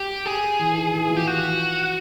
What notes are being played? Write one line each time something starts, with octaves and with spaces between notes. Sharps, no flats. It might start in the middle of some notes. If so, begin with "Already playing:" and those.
Already playing: G4
G#4
E3
D#3
E3
F3
G4
F#4